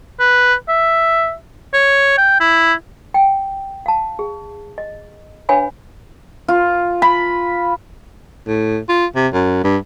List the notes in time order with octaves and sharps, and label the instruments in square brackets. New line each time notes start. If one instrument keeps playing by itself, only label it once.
[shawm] B4
E5
C#5
G5
E4
[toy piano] G5
F5 A5
G#4
D#5
D4 B4 C#5 F5 G#5 B5
[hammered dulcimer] F4
B5
[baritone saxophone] A2
F4
C3
F#2
G2